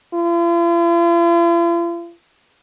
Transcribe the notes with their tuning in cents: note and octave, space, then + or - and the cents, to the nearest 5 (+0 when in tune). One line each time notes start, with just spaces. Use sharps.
F4 -45